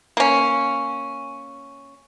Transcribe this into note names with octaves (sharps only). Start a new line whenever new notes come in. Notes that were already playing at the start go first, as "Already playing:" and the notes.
A#3 C#4